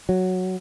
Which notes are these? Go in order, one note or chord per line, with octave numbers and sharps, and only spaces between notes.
F#3